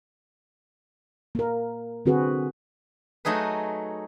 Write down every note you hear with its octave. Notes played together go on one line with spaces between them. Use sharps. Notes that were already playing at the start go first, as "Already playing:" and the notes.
A#3 A#4
D3 C4 F#4 G#4 B4
F#3 A3 D#4 G#4 B4